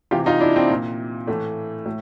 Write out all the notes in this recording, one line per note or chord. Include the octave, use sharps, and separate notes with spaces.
C3 E3 F4 G4
D#4 F4
D4 E4
C4 D4
A#2
A2 E3 A3
A2